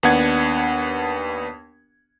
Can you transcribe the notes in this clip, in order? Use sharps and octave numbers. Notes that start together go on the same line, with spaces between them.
D#2 B3 D4 F#5 G#6